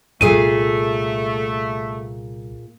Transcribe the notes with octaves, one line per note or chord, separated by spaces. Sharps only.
C2 A#2 A3 G#4 F5 D#7